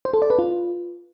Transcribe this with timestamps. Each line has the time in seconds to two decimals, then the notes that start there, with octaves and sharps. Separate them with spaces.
0.05 C5
0.13 A4
0.22 D5
0.30 B4
0.39 F4